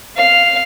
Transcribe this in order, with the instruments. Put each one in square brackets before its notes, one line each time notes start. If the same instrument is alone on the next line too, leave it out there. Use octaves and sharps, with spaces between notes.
[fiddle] F5